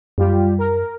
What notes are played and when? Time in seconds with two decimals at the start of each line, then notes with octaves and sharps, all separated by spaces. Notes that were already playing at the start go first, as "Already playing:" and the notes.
0.18 F#2 G3 F4 G4
0.58 A#4